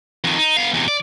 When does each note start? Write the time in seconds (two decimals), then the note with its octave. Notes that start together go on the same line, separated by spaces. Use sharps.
0.24 F2 D#3
0.38 D#4
0.57 B3 F5
0.74 E2 C3
0.88 D5